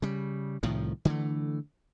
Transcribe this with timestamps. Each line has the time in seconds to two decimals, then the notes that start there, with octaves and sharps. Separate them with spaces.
0.02 C#3 G3
0.63 C2 A2 D#3 F3
1.05 D3 E3 A3